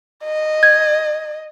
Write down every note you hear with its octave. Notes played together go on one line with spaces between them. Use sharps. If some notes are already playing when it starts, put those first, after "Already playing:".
D#5
G#6